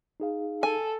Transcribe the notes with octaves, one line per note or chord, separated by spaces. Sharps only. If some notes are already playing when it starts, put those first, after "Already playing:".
D#4 G#4 F5
A4 G#5